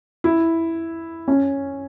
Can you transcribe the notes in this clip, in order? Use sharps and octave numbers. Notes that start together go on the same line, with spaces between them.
E4
C#4